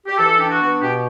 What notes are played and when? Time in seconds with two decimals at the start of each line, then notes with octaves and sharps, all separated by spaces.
0.06 G4
0.17 E3 A4
0.38 D4 G4
0.49 F#4
0.60 B3
0.81 B2 G4